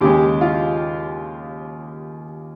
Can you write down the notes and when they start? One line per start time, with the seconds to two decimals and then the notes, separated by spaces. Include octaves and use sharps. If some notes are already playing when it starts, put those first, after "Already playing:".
0.01 D#2 C#3 G#3 G4
0.41 F4